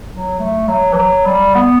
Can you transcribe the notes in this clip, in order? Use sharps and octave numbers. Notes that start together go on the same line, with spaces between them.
F#3
A3
F#3
E3
F#3
G3
B3